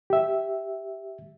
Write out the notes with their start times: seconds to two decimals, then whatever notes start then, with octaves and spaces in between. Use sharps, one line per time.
0.10 G4 E5